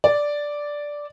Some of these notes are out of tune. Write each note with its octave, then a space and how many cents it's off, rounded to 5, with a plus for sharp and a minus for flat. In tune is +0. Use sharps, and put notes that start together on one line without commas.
D5 -5